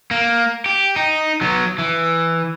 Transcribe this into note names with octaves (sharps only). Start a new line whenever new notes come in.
A#3
G4
D#4
F#3 B3
E3